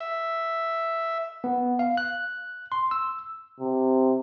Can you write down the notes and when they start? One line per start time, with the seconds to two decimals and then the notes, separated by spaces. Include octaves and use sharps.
0.01 E5
1.44 B3
1.79 F5
1.97 F#6
2.72 C6
2.91 E6
3.60 C3